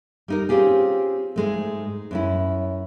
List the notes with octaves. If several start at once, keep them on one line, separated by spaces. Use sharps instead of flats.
G3 D#4 A#4
C4 C#4 F4 G4 G#4
G#2 G#3 A3
F#2 C#4 E4